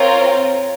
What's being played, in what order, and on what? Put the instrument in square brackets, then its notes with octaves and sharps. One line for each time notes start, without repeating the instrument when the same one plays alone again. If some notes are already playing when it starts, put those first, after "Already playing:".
Already playing: [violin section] C4 F4 A#4 [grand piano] C#5